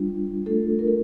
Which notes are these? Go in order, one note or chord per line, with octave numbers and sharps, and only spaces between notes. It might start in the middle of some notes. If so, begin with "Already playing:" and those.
Already playing: G3 D4 F4
A3 D4 F4 A4
A#4
A4